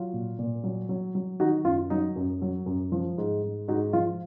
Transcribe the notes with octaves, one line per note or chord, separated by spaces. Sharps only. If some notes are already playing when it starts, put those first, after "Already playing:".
Already playing: F#3 F4
A#2
A#2
F#3
F#3
F#3
D#3 D#4 F#4
F#2 F4
F#3 D#4
F#2
F#3
F#2
F3
G#2
G#2
G#2 D#4 F#4
F3 F4